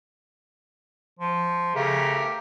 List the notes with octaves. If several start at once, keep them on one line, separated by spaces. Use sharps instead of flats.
F3
C#3 A3 G4 A#4